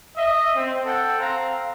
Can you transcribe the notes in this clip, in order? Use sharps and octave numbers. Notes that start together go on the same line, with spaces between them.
D#5 E5
C4
A4 F#5 G5
C4 F5 A#5